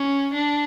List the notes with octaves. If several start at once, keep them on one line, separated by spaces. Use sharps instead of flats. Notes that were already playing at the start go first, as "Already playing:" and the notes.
Already playing: C#4
D4